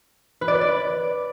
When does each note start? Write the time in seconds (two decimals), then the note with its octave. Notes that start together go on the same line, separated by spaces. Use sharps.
0.41 B4
0.48 D5
0.55 B4
0.61 D5